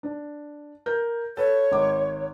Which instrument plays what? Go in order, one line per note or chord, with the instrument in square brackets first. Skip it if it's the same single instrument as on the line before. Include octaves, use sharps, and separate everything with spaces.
[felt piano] D4
A#4 G6
[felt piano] A4 B4 [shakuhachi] C#5
[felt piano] G#1 D6